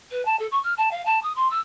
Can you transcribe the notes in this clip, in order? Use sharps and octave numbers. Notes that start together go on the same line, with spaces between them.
B4
A5
A4
C#6
F6
A5
F5
A5
D#6
C6
E6